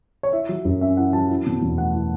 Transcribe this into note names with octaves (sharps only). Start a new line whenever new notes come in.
C#5
E4 E5
F#3
F#2
C#4 E5
E4 F#5
F#3 A5
E4
B2
E2
A3 F#5
E4